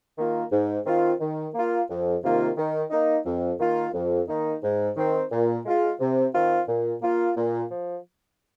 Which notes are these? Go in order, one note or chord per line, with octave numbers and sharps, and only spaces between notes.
D#3 A#3 F4
G#2
D#3 C4 F4
D#3
A#3 F4
F2
C3 D#3 A#3 F4
D#3
A#3 D#4
F2
D#3 A#3 F4
F2
D#3 A#3 D#4
G#2
D#3 C4
A#2
G#3 F4
C3
D#3 C4 F4
A#2
A#3 F4
A#2
F3